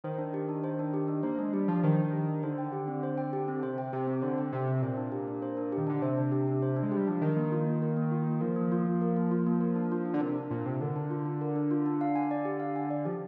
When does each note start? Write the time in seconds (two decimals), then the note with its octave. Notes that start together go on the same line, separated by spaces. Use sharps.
0.04 D#3 C5
0.18 D4
0.34 G4
0.49 D4
0.64 C5
0.79 D4
0.94 G4
1.08 D4
1.23 A#3 C5
1.38 G#3 D4
1.53 G3 G4
1.68 F3 D4
1.83 D#3 C5
1.99 D4
2.13 G4
2.28 D4
2.43 D3 C5
2.58 G5
2.73 G4
2.88 C4
3.03 C5
3.18 G5
3.33 G4
3.48 C4
3.63 C3 C5
3.78 G5
3.93 C3 G4
4.07 C4
4.22 D3 C5
4.38 G5
4.53 C3 G4
4.68 C4
4.82 A#2 C5
4.97 D4
5.12 G4
5.27 D4
5.42 C5
5.57 D4
5.72 D#3 G4
5.87 D3 D4
6.02 C3 C5
6.17 D4
6.32 G4
6.48 D4
6.62 C5
6.76 D4
6.83 G#3
6.92 G3 G4
7.07 F3 D4
7.22 D#3 A#4
7.37 A#3
7.52 F4
7.67 A#3
7.82 A#4
7.97 A#3
8.11 F4
8.27 A#3
8.41 F3 A#4
8.56 A#3
8.72 F4
8.86 A#3
9.01 A#4
9.16 A#3
9.31 F4
9.47 A#3
9.61 A#4
9.76 D4
9.92 F4
10.06 D4
10.14 D3
10.21 C3 A#4
10.36 D4
10.51 A#2 F4
10.66 C3 D4
10.81 D3 A#4
10.96 D4
11.11 F4
11.25 D4
11.41 A#4
11.56 D4
11.71 F4
11.86 D4
12.01 F5
12.16 G#5
12.31 D5
12.45 G4
12.60 F5
12.76 G#5
12.91 D5
13.05 F3 G4